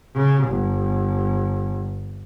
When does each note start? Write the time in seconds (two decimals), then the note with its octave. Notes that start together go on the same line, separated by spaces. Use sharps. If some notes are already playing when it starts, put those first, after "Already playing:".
0.15 C#3
0.48 G1